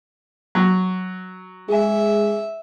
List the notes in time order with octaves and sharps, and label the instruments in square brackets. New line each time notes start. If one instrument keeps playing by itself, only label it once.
[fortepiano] F#3
[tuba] G#3 [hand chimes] G#4 G#5 [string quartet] E5